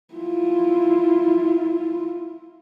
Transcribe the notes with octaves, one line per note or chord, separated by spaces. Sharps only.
E4 F4